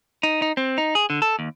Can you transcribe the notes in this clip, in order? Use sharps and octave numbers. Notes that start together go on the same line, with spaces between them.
D#4
D#4
C4
D#4
G#4
D3
A4
D#2